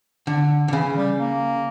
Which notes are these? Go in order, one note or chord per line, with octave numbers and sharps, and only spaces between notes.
D3
D3
C#3 E3
G3
A#3